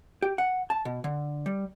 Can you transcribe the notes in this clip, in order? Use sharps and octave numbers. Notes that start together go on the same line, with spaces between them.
G4
F#5
A5
B2
D3
G3